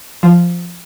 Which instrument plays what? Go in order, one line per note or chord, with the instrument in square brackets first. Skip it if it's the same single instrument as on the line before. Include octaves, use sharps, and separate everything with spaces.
[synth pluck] F3